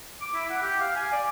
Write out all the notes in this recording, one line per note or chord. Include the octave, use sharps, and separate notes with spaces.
D6
E4
F#5
G4
F5
G#5
D5